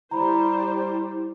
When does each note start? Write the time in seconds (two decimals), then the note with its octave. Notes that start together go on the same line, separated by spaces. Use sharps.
0.11 G3 E4 C5 A#5 B5